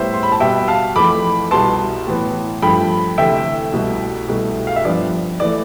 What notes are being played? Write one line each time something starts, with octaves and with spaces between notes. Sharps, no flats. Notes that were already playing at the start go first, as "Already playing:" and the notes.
Already playing: A2 G3 B3 C5 E5
C6
B5
A5
B2 G3 B3 E5 G5
F5 A5
F2 E3 A3 B5 D6
C2 B2 B3 A5 C6
A2 E3 B3
G2 F3 A3 G5 B5
D2 C3 E3 A3 E5 G5
C2 B2 A3
C2 B2 A3
F5
E5
G2 F3 B3 D5
E3 A3 D5